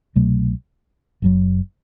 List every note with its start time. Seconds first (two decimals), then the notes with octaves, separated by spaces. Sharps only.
0.16 C2 B2 F#3 A3
1.22 F#1 F#2 F#3